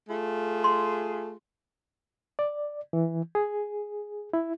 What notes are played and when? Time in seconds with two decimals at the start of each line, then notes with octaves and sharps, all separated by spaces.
0.09 A3 F4 G#4
0.64 C6
2.39 D5
2.93 E3
3.35 G#4
4.33 E4